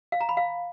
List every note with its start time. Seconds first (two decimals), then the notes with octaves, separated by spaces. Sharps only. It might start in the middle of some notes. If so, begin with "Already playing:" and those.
0.12 F5
0.21 A#5
0.29 B5
0.37 F5